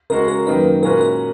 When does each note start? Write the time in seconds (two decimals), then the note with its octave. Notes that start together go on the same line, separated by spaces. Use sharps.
0.10 C#3 G#3 C#4 F#4 A#4
0.28 A#4
0.46 F#2 D#3 A#3 D#4 B4
0.82 A#2 G#3 C#4 F#4 A#4 B4
1.01 A#4